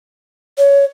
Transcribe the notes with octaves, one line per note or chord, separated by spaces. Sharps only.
C#5